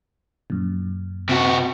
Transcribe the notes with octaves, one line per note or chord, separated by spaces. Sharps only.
F#2 A#2
C3 F#4